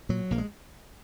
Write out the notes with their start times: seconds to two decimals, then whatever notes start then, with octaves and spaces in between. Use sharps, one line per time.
0.09 A#2 F#3
0.31 A#1 A#3
0.38 G#3